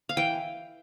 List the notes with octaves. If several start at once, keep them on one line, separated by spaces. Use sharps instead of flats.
F5
E3 G5